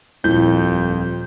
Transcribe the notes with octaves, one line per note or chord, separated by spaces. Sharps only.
D#1 F2 E4 G6